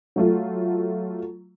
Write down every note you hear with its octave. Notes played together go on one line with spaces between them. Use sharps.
F#3 A3 F4